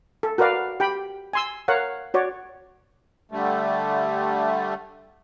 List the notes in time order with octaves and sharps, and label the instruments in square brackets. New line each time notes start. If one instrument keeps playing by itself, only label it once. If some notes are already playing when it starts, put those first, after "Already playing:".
[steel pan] A4
F#4 A#4 B4 D5 F5
G4 G5 B5
G#5 C6 E6
A#4 C#5 F5 F#5
F#4 C#5 D5
[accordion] D3 G3 A3